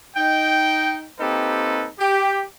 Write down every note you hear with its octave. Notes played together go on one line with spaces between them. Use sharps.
D#4 G5
A#3 C4 D#4 G4 A4 B4
G4